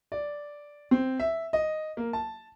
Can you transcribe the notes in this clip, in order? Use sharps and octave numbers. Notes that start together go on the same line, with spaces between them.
D5
C4
E5
D#5
A#3
A5